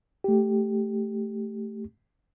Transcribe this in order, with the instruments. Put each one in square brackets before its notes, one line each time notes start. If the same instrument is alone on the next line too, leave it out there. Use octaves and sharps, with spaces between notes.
[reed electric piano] A3 G4